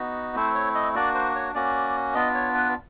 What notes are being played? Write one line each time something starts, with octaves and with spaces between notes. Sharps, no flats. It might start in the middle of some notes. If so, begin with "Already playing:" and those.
Already playing: B3 D#4 F#4
A3 C4 E4 C5
C#5
D#5
A#3 D4 F#4 D5
C5
C#5
A#3 C#4 F#4 D5
B3 D4 F4 D#5
C#5
B4